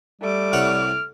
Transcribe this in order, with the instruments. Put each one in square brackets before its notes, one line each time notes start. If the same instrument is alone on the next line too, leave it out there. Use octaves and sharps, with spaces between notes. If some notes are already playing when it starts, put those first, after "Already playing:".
[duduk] G3 [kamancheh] A3 D6
[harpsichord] C2 C#5 F#5 [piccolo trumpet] F6